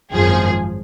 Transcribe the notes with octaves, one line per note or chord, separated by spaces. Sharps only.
G#1 F#2 F3 G#4